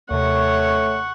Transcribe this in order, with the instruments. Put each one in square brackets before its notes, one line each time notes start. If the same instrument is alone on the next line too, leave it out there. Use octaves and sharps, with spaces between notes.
[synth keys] D#2 C3 [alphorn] A3 [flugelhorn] C#5 [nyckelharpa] F#5 C#6